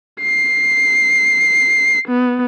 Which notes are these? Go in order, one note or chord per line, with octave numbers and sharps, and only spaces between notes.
C7
B3